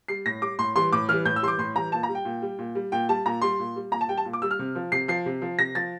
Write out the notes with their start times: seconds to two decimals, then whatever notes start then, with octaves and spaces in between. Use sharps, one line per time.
0.08 G3 C7
0.26 A2 A#6
0.42 G3 D6
0.59 A2 C6
0.76 E3 G3 C6
0.92 A2 D6
1.09 E3 G3 F6
1.25 A2 G6
1.36 E6
1.42 E3 G3 C6
1.48 D6
1.58 A2 C6
1.75 E3 G3 A#5
1.92 A#2 A5
2.03 A#5
2.09 G3
2.15 G5
2.25 A#2
2.42 G3
2.59 A#2
2.75 G3
2.92 A#2 G5
3.09 G3 A5
3.26 A#2 A#5
3.42 G3 C6
3.59 A#2
3.76 G3
3.91 A#2 A#5
4.01 A5
4.09 G3 G5
4.17 A5
4.25 A#2
4.33 D6
4.42 G3 E6
4.51 F6
4.59 C3
4.75 F3
4.92 C3 C7
5.08 F3 C7
5.26 C3
5.42 F3
5.59 C3 A#6
5.75 F3 A6